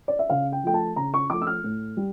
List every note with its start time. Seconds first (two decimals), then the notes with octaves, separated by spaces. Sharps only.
0.08 D5
0.19 E5
0.30 C#3 F5
0.52 G5
0.63 F3 A3 G5
0.74 A5
0.96 C#3 A#5
1.14 C#6
1.30 F3 A3 D6
1.42 E6
1.47 F6
1.64 A2
1.97 G3